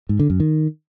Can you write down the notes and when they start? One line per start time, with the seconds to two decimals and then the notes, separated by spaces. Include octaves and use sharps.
0.09 G#2
0.20 D3
0.30 F#2
0.40 D#3